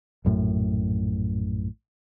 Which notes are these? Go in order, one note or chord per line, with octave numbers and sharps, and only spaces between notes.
A#1 F#2 A2